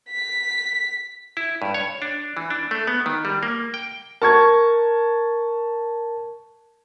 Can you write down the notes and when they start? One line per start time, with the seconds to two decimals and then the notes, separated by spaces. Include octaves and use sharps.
0.10 B6
1.37 E4
1.62 G2
1.74 C#5
2.02 D4
2.37 E3
2.50 D4
2.71 A3
2.87 B3
3.06 D#3
3.25 G3
3.43 A#3
3.74 G5
4.22 A#4 A5 C#6 G#6